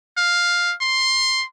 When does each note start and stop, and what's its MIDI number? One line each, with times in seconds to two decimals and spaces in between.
0.17 0.75 77
0.81 1.45 84